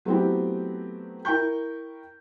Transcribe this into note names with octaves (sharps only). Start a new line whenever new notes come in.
F#3 A3 B3 C4 E4 G4
E4 A#4 G5 C#6 G6